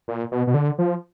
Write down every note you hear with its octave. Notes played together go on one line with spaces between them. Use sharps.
A#2
B2
B2
D3
F3